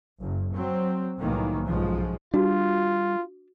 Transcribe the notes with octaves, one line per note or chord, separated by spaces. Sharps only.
F#1
F#3 C4
C2 A2 D#3 E3 F#3 A#3
B1 G#2 C#3 F3 G#3
G3 D4 F4 F#4